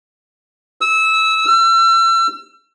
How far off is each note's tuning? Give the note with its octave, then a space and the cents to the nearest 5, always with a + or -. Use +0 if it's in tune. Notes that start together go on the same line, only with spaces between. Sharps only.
E6 -20
E6 +35